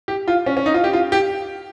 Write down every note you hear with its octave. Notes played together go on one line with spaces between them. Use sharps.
G4
F4
C#4
C#4
D#4
F4
G4
F4
G4